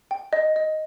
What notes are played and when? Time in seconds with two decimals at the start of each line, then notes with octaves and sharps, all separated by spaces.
0.11 G5
0.33 D#5
0.56 D#5